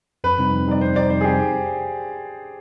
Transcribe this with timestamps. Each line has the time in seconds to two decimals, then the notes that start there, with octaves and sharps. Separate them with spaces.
0.24 F2 B4
0.38 C3 G3 C4 D#4
0.53 F2
0.67 C3 G3 C4 D#4 D5
0.81 F2 C5
0.96 C3 G3 C4 D#4 D5
1.10 F2 C5
1.21 G#4
1.24 C3 G3 C4 D#4 G4